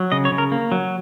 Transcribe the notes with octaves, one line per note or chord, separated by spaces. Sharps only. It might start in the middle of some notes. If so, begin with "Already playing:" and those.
Already playing: F#3
C#3 D#5
C#5
C#3
A#4
A#3
F#3